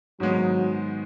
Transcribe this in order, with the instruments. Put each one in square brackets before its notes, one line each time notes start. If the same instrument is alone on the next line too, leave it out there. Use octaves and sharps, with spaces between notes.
[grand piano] G#2 D#3 G#3 B3 [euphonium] F#3